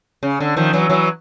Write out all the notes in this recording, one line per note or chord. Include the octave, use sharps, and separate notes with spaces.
C#3
D3
D#3 F3
E3 F#3
E3 F#3